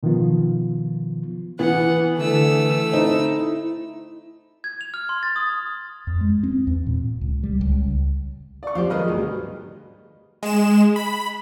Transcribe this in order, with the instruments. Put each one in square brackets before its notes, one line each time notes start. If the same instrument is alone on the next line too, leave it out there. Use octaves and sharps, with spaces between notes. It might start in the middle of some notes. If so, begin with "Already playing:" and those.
[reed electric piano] B2 D#3 F3 B3 F4
[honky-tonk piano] E3 B3 [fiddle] F#5
[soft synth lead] D3 [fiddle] A3 E6
[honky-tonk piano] C4 D#4 [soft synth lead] E4
[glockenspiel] G#6
F7
F6
C6
A6
D#6
[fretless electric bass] F2
G#3
C4
E2
A#2
C#2
G3
C#2
[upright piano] D5 C#6
[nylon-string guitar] F3 C4 G4 [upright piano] F5
[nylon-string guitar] D#3 G#3 D#4 [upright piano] B4 D#5 F6
[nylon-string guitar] D2 [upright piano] B2 G3
[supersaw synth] G#3 E7
B5